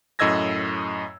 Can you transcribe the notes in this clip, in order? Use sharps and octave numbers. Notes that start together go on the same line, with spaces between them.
F#2 A2 D#5 E6 G#6 A#6